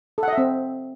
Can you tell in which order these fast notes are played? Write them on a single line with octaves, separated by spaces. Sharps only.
A4 F#5 D#5 E5 C4